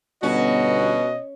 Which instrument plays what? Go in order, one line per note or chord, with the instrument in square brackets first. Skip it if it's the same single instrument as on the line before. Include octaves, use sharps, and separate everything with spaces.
[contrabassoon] G1 [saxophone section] B2 F#4 [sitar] C#4 [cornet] D#5